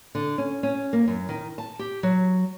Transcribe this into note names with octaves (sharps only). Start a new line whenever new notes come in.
D3
C#4
C#4
A#3
F#2
D#3
A5
G4
F#3